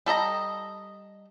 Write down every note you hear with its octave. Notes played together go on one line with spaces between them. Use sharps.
G3 A4 D#5 A#5